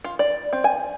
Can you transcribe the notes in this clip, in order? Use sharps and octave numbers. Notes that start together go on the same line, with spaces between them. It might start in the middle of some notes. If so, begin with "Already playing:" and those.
F4
D5
C4
G#5